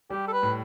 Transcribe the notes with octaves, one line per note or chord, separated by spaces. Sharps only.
G3 G4
A4
B4
A2